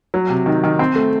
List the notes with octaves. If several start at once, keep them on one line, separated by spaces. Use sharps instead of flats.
F#3
C3
D#3
D#3
C4
A3